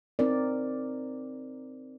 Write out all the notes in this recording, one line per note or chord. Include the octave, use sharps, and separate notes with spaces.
C4 D#4 A#4 D5